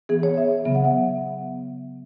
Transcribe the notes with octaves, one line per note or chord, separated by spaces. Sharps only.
E3 B3 G#4
C#5
E5
C#3 F#3 B3 E5
F#5
E5